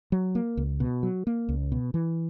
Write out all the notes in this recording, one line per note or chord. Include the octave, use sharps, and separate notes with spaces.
F#3
A#3
C#2
B2
F#3
A#3
C#2
B2
E3